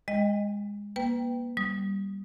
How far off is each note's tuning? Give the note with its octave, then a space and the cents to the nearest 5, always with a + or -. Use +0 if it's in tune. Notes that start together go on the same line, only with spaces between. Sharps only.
G#3 -20 D#5 +0 G5 +15
A#3 +35 B4 +25 G5 +0
G3 +0 D#6 +0